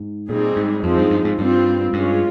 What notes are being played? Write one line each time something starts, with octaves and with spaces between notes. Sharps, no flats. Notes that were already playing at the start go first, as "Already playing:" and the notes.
Already playing: G#2
A#2 G3 C4 D#4 G#4
G#2
F2 F3 G#3 C4 D#4
G2
G2
G#2
G2 G3 C4 F4
G2 G#3 C#4 F4